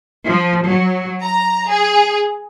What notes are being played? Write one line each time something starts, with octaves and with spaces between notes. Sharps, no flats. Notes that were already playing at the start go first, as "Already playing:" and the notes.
F3
F#3
A#5
G#4